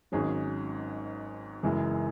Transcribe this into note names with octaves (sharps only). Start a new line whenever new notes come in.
G#1 G#2 F#3 C#4 G#4
F#1 F#2 E3 G#3 E4